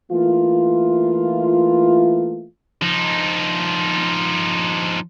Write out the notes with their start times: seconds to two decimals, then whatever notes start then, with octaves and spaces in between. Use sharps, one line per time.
0.11 E3 A3 A#3 F4
2.82 F3 D#4